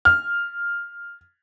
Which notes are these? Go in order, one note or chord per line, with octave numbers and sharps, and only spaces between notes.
F6